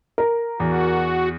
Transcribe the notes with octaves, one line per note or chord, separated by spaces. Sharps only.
A#4
E2 F#4